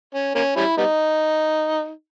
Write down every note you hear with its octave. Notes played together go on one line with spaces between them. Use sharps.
C#4
A#3 C#4
G3 C#4 E4
G3 B3 D#4